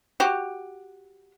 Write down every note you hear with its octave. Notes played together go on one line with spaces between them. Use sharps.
F#4 G4